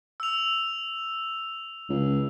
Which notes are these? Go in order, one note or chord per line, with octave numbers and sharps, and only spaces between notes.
E6 F7
C#2